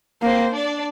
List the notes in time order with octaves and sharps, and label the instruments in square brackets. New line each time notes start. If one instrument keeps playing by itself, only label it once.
[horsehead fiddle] A#3 [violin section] C4 C5
[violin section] D4 D5